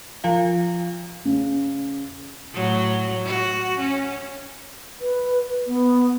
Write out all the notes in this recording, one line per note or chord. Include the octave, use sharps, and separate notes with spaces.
F3 F4 F5
C#3
A2 F#3
F#4
C#4
B4
B3